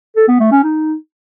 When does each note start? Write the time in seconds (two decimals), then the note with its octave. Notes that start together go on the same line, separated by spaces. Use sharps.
0.16 A4
0.28 B3
0.40 A3
0.52 C#4
0.63 D#4